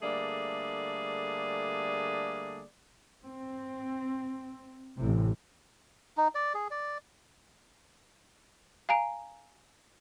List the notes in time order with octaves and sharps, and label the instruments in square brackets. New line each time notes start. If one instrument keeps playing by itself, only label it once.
[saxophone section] D3 G3 A3 A#3 G#4 D5
[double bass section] C4
A1 C3
[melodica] D#4
D5
G#4
D5
[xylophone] F5 G#5 A#5 D7